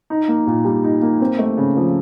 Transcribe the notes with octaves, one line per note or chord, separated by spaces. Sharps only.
D#4
A#3
A#2
G3
D#4
A#3
C4
A3
C#3
F3